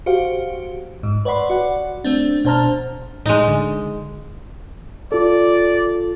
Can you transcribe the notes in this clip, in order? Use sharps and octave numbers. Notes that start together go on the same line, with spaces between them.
F#4 G4 C5 F5
G#2
B4 C#5 D5 F#5 B5 C6
F#4 D5 F#5
A3 C4 D4
B2 D4 C5 A5 A#5 F6
A2 G#3 D#4
D3
F4 A4 D5